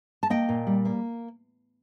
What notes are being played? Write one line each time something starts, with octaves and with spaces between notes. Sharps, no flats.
A5
A#3 D#5 G5
A#2
G3
A#3